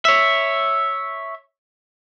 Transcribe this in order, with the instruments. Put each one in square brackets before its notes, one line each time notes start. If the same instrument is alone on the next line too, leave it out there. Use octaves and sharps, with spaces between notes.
[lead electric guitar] C#5 E5